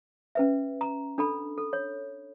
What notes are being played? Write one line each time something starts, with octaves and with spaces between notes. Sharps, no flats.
C#4 B4 E5
A#5
D4 A4 B5
A4
C#5